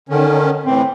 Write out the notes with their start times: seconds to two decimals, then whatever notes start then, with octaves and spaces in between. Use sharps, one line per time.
0.09 D3 D#3 C#4
0.65 A2 E3 C4